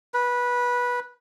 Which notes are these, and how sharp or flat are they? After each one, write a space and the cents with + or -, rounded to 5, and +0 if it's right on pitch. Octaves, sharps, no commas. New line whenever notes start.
B4 -15